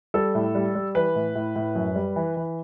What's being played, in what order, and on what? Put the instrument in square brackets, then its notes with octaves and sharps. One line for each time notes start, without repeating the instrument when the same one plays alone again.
[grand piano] G3 A4
A2
G3
G3
E3 B4
A2
A2
A2
F#2
G3
E3
E3